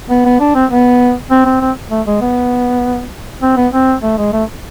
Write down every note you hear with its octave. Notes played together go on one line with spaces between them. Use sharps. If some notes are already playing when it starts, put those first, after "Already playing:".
B3
B3
D4
C4
B3
C4
C4
C4
A3
G#3
B3
C4
B3
C4
A3
G#3
A3